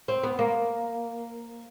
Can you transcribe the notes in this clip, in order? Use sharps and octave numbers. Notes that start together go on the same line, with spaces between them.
C4
B3
A#3